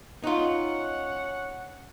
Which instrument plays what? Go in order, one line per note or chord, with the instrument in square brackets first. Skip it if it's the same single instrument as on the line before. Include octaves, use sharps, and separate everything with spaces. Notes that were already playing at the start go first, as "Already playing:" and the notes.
[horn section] C#4 C#5 F#5 [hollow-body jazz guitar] D#4 F4